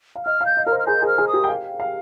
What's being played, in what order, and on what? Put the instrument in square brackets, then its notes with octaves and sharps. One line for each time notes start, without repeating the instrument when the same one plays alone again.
[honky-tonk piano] F5
[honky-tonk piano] D#5 [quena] F6
[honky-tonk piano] F5
[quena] G6
[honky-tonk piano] D#5
[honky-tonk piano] A#4 [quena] F6
[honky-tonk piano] C5
[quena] F6
[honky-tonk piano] G#4 [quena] G6
[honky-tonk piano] G#4
[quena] F6
[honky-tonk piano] G#4
[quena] D#6
[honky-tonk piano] G4
G5
F5
F5